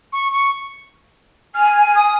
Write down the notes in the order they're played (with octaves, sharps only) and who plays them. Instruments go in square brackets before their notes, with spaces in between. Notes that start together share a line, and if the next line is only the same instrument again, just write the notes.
[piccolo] C#6
C#6
[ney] G#5 [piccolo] F6
[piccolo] D#6